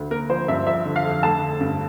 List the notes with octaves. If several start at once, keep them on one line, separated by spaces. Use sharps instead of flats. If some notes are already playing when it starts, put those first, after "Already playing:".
Already playing: D2
A#3 A#4
F3 C5
G2 E5
F3 E5
D3
F5
F2
A3 A5
D3
G2